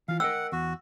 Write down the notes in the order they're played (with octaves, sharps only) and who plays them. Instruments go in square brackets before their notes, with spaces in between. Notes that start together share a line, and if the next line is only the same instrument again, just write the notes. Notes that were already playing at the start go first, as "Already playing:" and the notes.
[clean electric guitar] E3 F4 [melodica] F5
[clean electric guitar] A#4 D#5 G5 [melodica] F#5 [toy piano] E6
[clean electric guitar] E2 [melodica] F#4